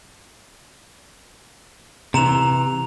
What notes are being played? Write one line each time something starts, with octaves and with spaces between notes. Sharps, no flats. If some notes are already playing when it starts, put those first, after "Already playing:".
C3 E3 A#5 E7 F7